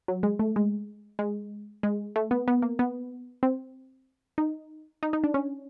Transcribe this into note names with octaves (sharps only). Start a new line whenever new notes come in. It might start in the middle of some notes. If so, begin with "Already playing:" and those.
F#3
G#3
A3
G#3
G#3
G#3
A3
B3
B3
A#3
B3
C4
D#4
D#4
D#4
D4
C#4